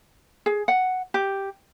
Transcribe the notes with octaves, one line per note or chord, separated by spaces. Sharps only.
G#4
F#5
G4